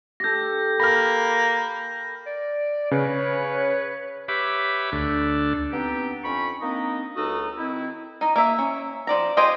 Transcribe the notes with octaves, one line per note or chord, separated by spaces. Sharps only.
G4 A4 G6 A#6
A#3 B5 F6 A#6
D5
C#3 B4 C#5
G4 B4 C#5 E5 B5 D6
D2 D4 A4
B3 C4 D4 D#4 G4
F2 C#4 B5 C#6
A#3 C4 D4 D#4 D#5
C#2 D#4 F#4 A4 D#6
D#3 C4 E4
D#4 D#5
A#3 E5
C#4
F3 D5 A#5
F4 G4 G#4 C5 D#5